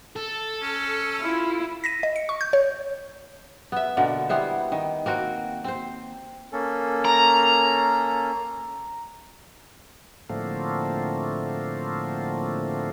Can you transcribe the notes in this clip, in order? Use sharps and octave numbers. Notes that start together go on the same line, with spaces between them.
A4
C#4
E4 F4
A#6 B6 D#7
D#5
C#7
C#6
G6
C#5
B3 E5
B2 D3 A#3
G3 B3 E4 C5
D#3
A#3 C4 F#4
C4 C5
A#3 C#4 A4
A#5
A2 D3 F3 A3 A#3 C4